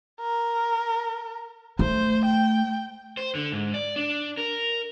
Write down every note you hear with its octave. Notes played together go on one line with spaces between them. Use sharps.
A#4
A3 C5
G5
C5
D3
G#2
D5
D4
A#4